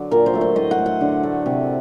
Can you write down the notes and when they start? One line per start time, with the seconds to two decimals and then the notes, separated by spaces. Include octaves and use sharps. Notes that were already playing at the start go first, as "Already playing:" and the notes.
Already playing: D3 F#3
0.11 A#2 A#4
0.26 C5
0.34 F#3 A3
0.41 C5
0.56 A2 D#5
0.71 F#5
0.79 A3
0.86 F#5
1.01 D3
1.23 A3
1.46 C3